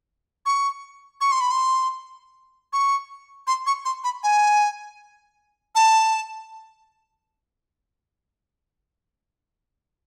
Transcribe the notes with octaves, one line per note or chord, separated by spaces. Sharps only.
C#6
C#6
C6
B5
C6
C#6
C6
C#6
C6
B5
G#5
A5